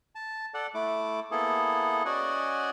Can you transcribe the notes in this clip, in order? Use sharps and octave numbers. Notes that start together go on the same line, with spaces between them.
A5
A4 D5 F#5
A3 E4 D6
A#3 B3 E4 G#4 A4
C#4 F#4 D5 D#5 F#5 G#5